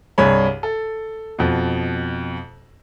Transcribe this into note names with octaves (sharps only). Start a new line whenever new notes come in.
C2 G2 G#4 C#5 B5
A4
F2 B2